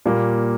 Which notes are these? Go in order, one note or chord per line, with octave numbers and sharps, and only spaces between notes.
A#2 G3 A#3